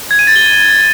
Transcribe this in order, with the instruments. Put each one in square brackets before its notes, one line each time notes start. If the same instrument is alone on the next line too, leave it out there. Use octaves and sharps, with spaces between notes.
[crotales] G#6
D#7
A6
G7